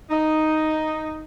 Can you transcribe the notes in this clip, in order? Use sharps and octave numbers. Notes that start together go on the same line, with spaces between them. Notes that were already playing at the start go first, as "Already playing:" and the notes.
D#4